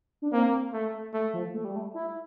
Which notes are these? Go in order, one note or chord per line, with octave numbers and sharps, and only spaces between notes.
D4
A#3 C4
A3
A3
F3
A3
G3
A3
E4